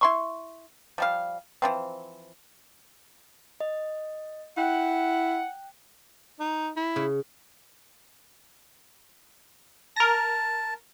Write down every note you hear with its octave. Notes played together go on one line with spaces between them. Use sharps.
E4 C6 C#6
F3 G3 F5
E3 F3 C4
D#5
E4 F#5 G5 F#6
D#4
E4
C#3
A#4 A5 A#6